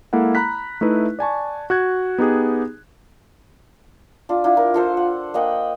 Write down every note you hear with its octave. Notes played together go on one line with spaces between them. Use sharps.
G#3 A#3 E4 A4 F#5
A#5 B5 F#6 B6
A3 D#4 E4 B4
D5 G#5 A5 C#6
F#4 F#6 G#6
B3 D#4 G4 G#4
D4 F4
D4 E4 F4
A#4
F4 A4 C5
F#5
A#3 D#5 F#5 G5